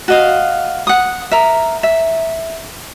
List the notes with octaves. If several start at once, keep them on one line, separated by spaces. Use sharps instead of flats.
F#4 D#5 F5
F#5 D#6
A#4 E5
E5